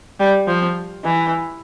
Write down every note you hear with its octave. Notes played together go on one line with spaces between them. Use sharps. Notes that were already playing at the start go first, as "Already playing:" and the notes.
G3
F3
E3